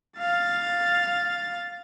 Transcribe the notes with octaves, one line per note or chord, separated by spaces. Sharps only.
F5 A6